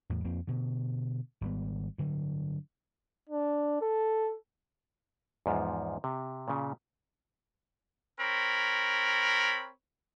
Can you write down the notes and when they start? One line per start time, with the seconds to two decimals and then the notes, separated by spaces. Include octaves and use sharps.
0.10 E2 A2
0.24 F2 F3 A#3 C4
0.47 B2 D3
1.41 G#1 G3 B3
1.98 G2 D3 F#3
3.29 D4
3.81 A4
5.46 E2 G#2 F3
6.04 C3
6.48 A#2 C#3
8.19 C4 A#4 C#5 B5